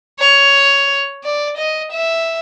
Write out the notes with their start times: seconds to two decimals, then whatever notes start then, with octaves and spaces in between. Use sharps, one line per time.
0.20 C#5
1.24 D5
1.58 D#5
1.92 E5